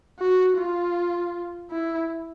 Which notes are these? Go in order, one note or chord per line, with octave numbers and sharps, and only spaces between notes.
F#4
F4
E4